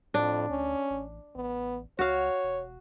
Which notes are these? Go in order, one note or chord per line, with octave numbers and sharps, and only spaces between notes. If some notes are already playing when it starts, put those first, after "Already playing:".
F2 A2 D4
D2 C#4
A1
A1 B3
C#2 F#4 C#5 F5
E1